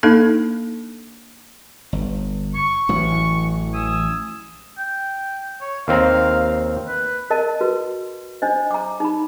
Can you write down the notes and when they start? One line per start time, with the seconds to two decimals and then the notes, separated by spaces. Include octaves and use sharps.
0.03 A#3 D4 D#4 A4
1.93 G1
2.54 C#6
2.89 A1 E3 F#3
3.73 G#5 D#6 E6
4.78 G5
5.61 C#5
5.88 D#2 C4 F5 A#5
6.87 B4
7.30 A#4 D#5 A5
7.61 F#4 B4
8.42 D4 C5 D#5
8.71 A#5 D6
9.00 D#4 B5